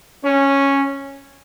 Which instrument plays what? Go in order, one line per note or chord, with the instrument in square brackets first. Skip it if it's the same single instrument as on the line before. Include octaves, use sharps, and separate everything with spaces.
[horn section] C#4